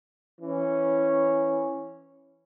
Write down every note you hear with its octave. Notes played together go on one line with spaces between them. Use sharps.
E3 C#4